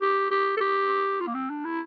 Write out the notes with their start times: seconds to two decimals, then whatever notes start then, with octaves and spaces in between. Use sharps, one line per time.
0.01 G4
0.31 G4
0.57 A4
0.60 G4
1.20 F4
1.27 A#3
1.34 C4
1.50 D4
1.65 E4